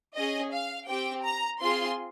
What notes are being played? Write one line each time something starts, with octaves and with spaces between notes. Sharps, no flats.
C#4 G#4 D#5
F5
C4 G4 G5
A#5
C4 F4 G#4 C6